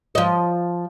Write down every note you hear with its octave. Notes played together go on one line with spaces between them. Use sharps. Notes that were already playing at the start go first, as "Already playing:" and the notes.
F3 D#5